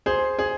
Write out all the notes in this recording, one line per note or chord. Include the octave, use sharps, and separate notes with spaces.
G#4 C5
G#4